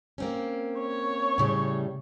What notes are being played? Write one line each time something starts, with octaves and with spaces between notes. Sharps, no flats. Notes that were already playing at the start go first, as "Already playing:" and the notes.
A#3 C4 C#4
C#5
A2 C#3 G3